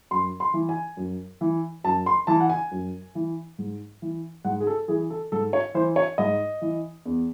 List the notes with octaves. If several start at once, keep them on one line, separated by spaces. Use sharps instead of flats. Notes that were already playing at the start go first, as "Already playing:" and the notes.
F#2 C6
C6
E3
G#5
F#2
E3
F#2 A5
C6
E3 A5
F#5
G#5
F#2
E3
G#2
E3
G#2 F#5
G#4
A4
E3 G#4
A4
G#2 A4
C#5
E3 C5
C#5
G#2 D#5
E3
E2